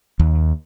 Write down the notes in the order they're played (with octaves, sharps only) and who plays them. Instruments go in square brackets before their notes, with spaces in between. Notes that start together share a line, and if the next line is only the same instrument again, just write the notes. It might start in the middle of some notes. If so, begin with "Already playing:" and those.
[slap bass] D#2